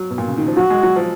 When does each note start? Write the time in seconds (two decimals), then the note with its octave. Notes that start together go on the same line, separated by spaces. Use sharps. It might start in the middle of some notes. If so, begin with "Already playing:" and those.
Already playing: F#3
0.10 B2
0.18 A#2
0.28 C#3
0.37 D#3
0.47 F3
0.57 F#3 F#4
0.70 G#3
0.83 F#3
0.96 F3